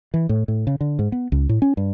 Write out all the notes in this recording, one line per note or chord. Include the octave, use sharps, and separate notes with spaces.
E3
A2
A2
C#3
D3
G#2
B3
C#2
A2
C#4
G2